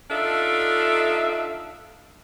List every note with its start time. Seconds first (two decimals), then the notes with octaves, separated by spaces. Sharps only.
0.10 D4 D#4 F4 A4 E5